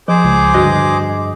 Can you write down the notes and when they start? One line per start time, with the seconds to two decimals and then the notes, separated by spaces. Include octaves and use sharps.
0.08 F3 G#4 C5 D6
0.24 C#2
0.54 G2 D3 F#4 D#5 F#6